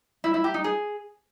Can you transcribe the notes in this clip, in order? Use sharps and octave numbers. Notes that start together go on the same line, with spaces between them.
E4
E4
G4
D#4
G#4